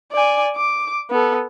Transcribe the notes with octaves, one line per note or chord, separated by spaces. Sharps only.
D5 G#5
D6
B3 A4